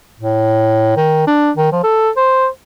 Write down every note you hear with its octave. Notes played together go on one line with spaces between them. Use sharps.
A2
D#3
D4
D#3
F3
A4
C5